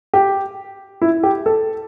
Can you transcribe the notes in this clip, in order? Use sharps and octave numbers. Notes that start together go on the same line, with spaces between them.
G4
E4
G4
A4